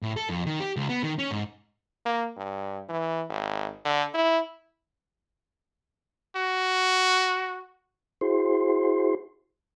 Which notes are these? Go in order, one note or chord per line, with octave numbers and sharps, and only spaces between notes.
A2
A4
F2
D#3
G4
C#2
B3
D#3
C#4
G#2
A#3
G2
E3
G#1
D3
E4
F#4
E4 F#4 G#4 C5 C6